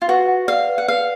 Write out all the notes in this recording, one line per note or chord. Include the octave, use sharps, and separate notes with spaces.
F4
F#4 B4
F#5
D5 F5
B4
F#5
B4 F5